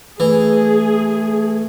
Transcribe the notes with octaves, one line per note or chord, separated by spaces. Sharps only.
E3 A3 G#4